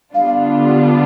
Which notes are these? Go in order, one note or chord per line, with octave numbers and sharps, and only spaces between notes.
D3 G3 B3 D4 F4 F5